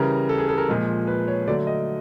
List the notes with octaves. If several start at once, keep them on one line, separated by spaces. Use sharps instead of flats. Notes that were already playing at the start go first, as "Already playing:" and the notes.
Already playing: C#3 E3 G3 A#4
A4
G#4
A4
A#4
A#2 F3 G#3
B4
C#5
D3 F#3 A3 D5
D#5